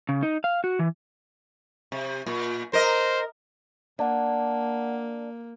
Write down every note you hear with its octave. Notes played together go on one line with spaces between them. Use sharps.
C#3
D#4
F5
F#4
E3
C3
A#2
A#4 C5 D#5
A#3 D4 D5 F#5